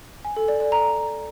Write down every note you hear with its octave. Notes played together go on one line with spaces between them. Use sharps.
G#5
A4
D5
D5
A#5